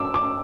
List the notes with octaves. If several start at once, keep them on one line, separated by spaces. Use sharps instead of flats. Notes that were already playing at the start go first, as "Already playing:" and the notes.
Already playing: D6 E6
D6